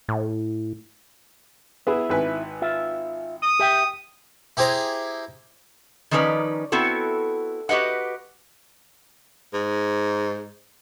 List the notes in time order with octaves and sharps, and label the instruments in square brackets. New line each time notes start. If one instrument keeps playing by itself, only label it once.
[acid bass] A2
[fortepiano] B3 G#4 [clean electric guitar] E4
[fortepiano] G#1 B4 G#5
[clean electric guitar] F4 E5
[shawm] D#6
[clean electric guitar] G4 E5 G5
[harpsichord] E4 G4 G#4 C5 A#5
[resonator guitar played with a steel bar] D#3 F3 C#4 D#4 B4 D5
B3 C4 E4 F#4 A4
F#4 G4 B4 D#5 F#5
[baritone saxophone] G#2